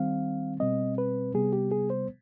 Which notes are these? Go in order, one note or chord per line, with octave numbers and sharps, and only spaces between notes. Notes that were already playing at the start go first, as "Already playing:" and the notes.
Already playing: D#3 G3 C4 F5
B2 G3 C4 D#5
B4
C3 G3 B3 G#4
G4
G#4
C5